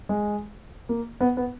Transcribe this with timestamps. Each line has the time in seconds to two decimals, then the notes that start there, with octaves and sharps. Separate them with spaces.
0.09 G#3
0.89 A#3
1.21 B3
1.37 B3